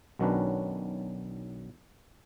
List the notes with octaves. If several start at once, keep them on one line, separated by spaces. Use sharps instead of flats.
B1 D#3 F#3 C#4 D4 B4